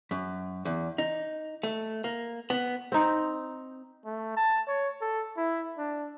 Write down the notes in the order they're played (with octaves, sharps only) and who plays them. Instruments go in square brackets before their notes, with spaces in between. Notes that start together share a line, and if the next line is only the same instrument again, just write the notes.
[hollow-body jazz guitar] F#2
E2
D#4
A3
A#3
B3
[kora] C4 D#4
[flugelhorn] A3
A5
C#5
A4
E4
D4